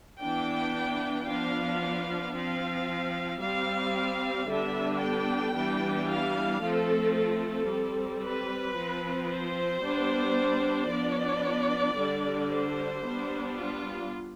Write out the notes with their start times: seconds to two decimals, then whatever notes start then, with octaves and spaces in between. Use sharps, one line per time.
0.21 E3 B3 D4 G5
1.27 F3 B3 D4 F5
2.34 F3 C4 F5
3.42 G3 C4 F5
4.48 D3 G3 B3 D4 E5
5.01 G5
5.55 E3 G3 B3 D4
6.09 F5
6.62 F3 A3 C4 A4
7.16 A4
7.68 G3 C4
8.23 B4
8.76 F3 C4
9.30 C5
9.83 G3 B3 D4
10.89 F3 B3 D4 D5
11.96 D3 G3 D4
12.50 C5
13.03 G3 B3 D4
13.57 F4